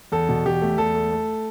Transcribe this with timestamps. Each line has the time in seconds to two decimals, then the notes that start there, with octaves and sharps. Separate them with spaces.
0.12 E2 A4
0.29 B2
0.45 E2 G4
0.62 A3
0.78 E2 A4
0.95 A3
1.12 A3